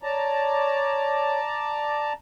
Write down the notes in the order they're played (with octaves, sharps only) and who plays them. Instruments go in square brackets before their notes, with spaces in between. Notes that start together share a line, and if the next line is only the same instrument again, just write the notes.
[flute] C#5 [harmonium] D5 A5 A#5